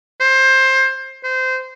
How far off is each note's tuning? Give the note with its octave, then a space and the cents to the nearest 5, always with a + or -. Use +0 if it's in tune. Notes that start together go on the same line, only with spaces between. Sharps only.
C5 +20
C5 -20